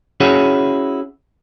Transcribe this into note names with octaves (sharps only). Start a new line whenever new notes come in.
C#4 E4 F#4 G#4 C#5 F#5